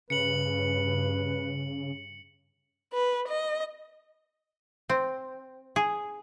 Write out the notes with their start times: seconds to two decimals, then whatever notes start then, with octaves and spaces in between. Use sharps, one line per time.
0.10 G2 C#3 B4 C#7 F#7
2.94 B4
3.29 D#5
4.89 C4
5.76 G#4